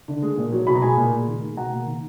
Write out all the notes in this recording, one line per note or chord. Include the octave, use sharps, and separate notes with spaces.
D3
G#3
A#2
F#3
B2 B5
A#5
G#3 G#5 B5
A#2
G#3
D#3
G#3
B2 F#5 A#5
A#3
D#3